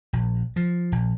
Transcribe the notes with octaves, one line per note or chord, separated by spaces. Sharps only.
A#1
F3
A#1